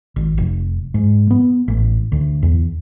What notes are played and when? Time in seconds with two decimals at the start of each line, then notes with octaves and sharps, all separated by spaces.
0.16 G#1
0.38 F1
0.94 G#2
1.31 B3
1.68 A1
2.12 D2
2.43 E2